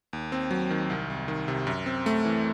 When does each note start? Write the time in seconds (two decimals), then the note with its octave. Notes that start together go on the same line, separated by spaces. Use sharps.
0.13 D#2
0.32 C4
0.51 F#3
0.70 D#3
0.90 C2
1.10 C2
1.28 D#3
1.48 C3
1.67 F#2
1.86 C4
2.06 A3
2.25 E3